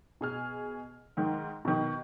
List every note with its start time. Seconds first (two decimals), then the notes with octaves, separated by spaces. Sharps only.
0.21 B2 G#4 F6
1.17 G#2 D#3
1.65 B2 D#3